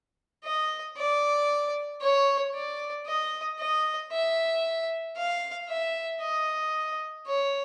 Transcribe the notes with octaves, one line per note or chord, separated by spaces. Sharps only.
D#5
D5
C#5
D5
D#5
D#5
E5
F5
E5
D#5
C#5